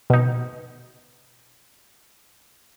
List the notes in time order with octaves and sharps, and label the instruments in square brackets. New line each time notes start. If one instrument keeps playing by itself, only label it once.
[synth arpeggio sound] B2 D#4